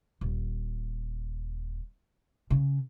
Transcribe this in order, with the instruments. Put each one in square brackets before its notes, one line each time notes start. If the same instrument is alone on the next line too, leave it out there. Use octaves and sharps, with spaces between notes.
[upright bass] D#1
C#3 C#4